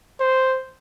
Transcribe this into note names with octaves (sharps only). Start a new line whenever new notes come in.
C5